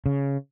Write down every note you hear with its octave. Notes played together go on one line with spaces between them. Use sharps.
C#3